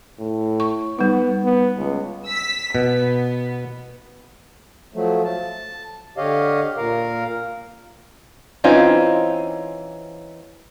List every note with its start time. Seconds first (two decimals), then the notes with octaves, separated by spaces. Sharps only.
0.19 A2
0.60 C#6
0.99 G3 B3 D#4
1.44 B3
1.77 C#2
2.26 E6 B6
2.75 B2 B3
4.94 F3 F#3 A3
5.24 A5
6.18 D3 G4 C#5 D#5 F5
6.77 A#2 A#4 F5
8.64 E3 C4 C#4 D#4 F4